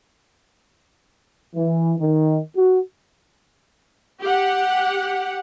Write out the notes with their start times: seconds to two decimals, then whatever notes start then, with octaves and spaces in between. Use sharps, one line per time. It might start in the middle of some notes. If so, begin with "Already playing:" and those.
1.55 E3
2.00 D#3
2.57 F#4
4.22 G4 F#5